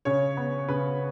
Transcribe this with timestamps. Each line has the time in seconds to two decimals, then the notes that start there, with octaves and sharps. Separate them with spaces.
0.05 C#3 C#5
0.37 B3
0.68 C#3 B4